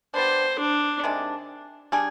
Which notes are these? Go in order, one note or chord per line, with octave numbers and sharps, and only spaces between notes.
G3 B3 D4 C5
D4
C3 D#3 G#3 D4
G3 D4 G#4